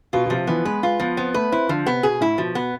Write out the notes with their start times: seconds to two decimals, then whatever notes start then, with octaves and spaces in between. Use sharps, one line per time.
0.13 B2 F4
0.26 B2
0.30 C3 F3
0.47 E3 B3
0.65 G#3 B4
0.83 G#3 F4
1.00 F3 B3
1.17 B3 C4
1.34 A3 B4
1.52 C4 E4
1.69 D3 F3
1.86 C3 B3
2.03 B2 G#4
2.21 A2 E4
2.38 B2 F3
2.55 B2 B3